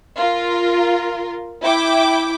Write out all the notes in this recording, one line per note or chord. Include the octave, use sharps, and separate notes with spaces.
F4 A#4
E4 G5 D6